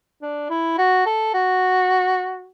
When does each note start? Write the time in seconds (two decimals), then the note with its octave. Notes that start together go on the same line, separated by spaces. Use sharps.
0.22 D4
0.50 E4
0.78 F#4
1.06 A4
1.34 F#4